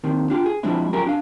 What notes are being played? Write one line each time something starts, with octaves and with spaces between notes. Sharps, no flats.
D#2 C3 D#3
D4 F4 G4
G#4
F3 G3 G#3 C4 D4 E4
F#2 F3 C#4 G4 G#4 A#4
D4 F5